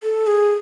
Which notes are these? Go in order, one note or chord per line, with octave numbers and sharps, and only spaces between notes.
A4
G#4